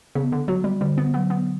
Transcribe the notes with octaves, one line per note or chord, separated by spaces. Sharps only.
C#3 B3
D3
F#3 F#4
G3
D3 G3
B3
F#3 B3
B3